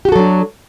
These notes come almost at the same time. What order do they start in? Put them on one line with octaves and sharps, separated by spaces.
G4 F#4 A4 F#3 D4